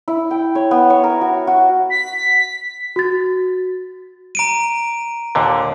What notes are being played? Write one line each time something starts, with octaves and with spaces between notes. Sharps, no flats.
E4
G5
C#5
B3
C#5
A#4
F#4
F#4
B6
F#4 A6
A#5 D7 D#7
D#2 A#2 D3